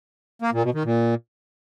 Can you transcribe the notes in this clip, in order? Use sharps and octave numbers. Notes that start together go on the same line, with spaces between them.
A#3
A#2
B2
D#3
A#2